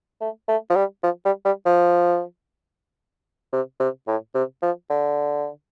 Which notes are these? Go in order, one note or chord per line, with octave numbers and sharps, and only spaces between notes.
A3
A3
F3
G3
F3
G3
G3
F3
C3
C3
A2
C3
F3
D3